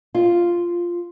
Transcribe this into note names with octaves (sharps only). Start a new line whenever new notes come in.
F4